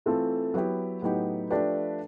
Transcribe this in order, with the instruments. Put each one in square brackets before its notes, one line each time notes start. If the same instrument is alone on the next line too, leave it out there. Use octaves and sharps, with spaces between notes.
[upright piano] E3 A3 C4 F4 A4
F#3 B3 E4 G4
A2 F#3 B3 D#4 G4
F3 A3 D4 G4 B4